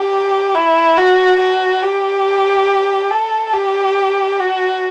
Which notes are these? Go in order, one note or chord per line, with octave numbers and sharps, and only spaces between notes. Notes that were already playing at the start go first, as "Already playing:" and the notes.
Already playing: G4
E4
F#4
F#4
G4
A4
G4
F#4